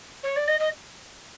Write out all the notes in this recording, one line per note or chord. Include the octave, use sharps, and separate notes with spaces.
C#5
D5
D#5
D#5